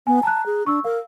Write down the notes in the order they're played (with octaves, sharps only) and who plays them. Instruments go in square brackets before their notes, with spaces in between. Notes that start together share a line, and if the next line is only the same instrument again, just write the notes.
[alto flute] B3 [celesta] G#5
[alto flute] A5 [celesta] A#5 F#6
[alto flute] G#4
[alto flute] D4 [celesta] C#6 E6
[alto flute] A#4 [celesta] F5 E6